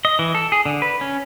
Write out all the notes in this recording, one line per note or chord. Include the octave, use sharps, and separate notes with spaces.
D#5
E3
A4
G#4
D3
B4
C#4